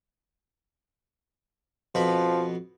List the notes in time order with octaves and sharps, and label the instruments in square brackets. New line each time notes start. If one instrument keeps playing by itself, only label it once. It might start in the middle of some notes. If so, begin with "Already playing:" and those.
[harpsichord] F2 B2 B4 [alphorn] F3